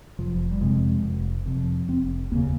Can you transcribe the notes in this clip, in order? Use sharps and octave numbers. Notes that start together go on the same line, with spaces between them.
F1 F3
G3
F2 C3 G#3
F1
F2 C3
F1 C4
D#2 C#3 A#3